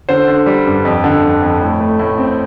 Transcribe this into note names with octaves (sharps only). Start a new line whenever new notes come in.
D3 C5
D3
G3
G2
F2
D3
F2
F2
A2
A3
A2
C4